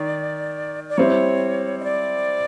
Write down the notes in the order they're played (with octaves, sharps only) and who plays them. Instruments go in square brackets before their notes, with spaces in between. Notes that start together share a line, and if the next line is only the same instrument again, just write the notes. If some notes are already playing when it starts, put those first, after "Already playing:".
Already playing: [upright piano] D#3 [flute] D5
[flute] D5
[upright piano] G3 C4 E4 [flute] C#5
[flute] D#5
D5